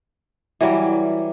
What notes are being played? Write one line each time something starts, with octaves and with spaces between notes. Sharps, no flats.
E3 F#3 G3